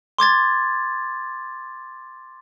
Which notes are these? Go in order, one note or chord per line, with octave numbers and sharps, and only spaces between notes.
C6 D6 G#6 A6